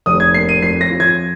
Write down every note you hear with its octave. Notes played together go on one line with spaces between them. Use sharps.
F1 D#6
G#6
A#3 C7
D#7
F2 C7
A#6
F3
G#6